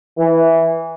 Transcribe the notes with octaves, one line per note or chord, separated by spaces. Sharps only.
E3